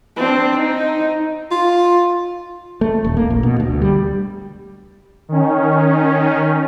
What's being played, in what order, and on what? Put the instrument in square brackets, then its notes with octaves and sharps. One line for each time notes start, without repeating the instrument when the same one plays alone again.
[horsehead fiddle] C4 D4
D#4
[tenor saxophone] F4
[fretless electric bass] A3
D#1
A#3
A#1
B2
D2
G3
[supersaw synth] D#3 C#4